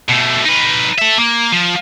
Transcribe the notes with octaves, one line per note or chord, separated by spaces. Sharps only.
B2 A3
D#4 B4
A4 E5
A#3
F3